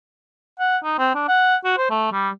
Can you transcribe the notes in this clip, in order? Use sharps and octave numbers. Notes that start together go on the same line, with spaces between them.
F#5
D#4
C4
D4
F#5
F#4
C5
A3
G3